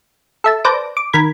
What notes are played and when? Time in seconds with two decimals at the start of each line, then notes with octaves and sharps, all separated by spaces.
0.44 A4 E5 A5
0.65 B4 C5 D5 A5 A#6 D7
0.97 D6
1.13 D#3 A#4 B5 G#6